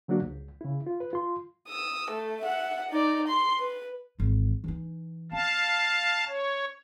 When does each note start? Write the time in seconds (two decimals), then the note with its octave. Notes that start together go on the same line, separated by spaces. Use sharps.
0.08 D3 F#3 A#3 D4 F#4
0.22 C#2
0.61 C#3 E4
0.87 F4
1.00 B4
1.13 F4 C6
1.68 D#6 E6
2.10 A3
2.40 E5 F#5
2.89 D#4 D5
3.27 C6
3.59 B4
4.19 G#1 E3
4.64 E3 D#4
5.32 C#4 F5 A5
6.28 C#5